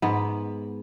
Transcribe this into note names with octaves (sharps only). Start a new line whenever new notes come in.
G#2 B3